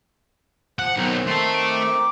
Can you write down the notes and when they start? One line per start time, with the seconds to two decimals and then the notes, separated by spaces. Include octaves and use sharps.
0.79 F3 F#5
0.96 B1 D#3 C4 D#4
1.27 A3 A5 C6
1.54 D6